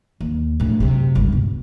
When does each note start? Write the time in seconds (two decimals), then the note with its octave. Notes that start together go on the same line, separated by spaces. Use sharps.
0.21 D#2
0.60 A#1 A2
0.80 F#2 C3
1.15 G1 C#2
1.32 B2